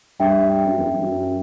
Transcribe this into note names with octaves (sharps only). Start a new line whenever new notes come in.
G2 E5 G5
F#2
E2
F#2
F#2